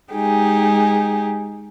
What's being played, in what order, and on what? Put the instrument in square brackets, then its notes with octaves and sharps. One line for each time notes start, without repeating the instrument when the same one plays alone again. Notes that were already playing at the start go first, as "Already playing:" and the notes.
[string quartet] G#3 D#4 G4 G#4